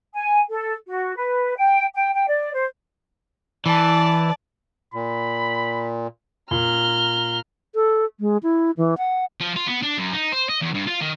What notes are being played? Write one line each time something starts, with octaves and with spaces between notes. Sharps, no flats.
G#5
A4
F#4
B4
G5
G5
G5
D5
C5
E3 D5 A5
A#2 B5
A#2 A#5 F6 G7
A4
G#3
E4
E3
F#5
F3
F4
B3
D4
F#2
D#4
C5
D#5
E2
G2
F4
D#3